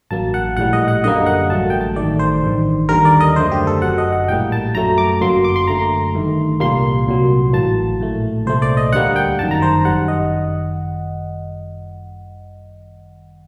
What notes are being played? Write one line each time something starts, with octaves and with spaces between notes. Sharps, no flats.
A1 G2 F#3 A#3 A5
F#5
A#1 A2 G3 F#5
D#5
F#5
F#2 D3 G3 A#3 D#5
F#5
A1 G2 F#3 A3 A5
G5
A5
A1 G2 D#3 A3 D5
C5
A1 G2 D#3
D#2 D3 G3 A#4
D5
D#5
F#2 D3 A3 C5
G4
A4
G1 F#2 F#3 F#5
D#5
F#5
A#1 A2 G3 A#3 G5
A5
F#2 F#3 A3 A#5
D6
G1 F#2 F#3 A#3 C6
D6
C6
F#2 D3 A3 A#5
C6
G1 G2 D#3 A3
C2 A#2 G3 A#3 C6
C2 A#2 F#3
A1 A2 F#3 A#3 A5
A#1 A2 A3
C2 A#2 A3 C5
D5
D#5
D2 D3 G3 A#3 F#5
G5
G1 F#2 D#3 A5
A#5
C5
G1 F#2 D#3 G3 F#5
D#5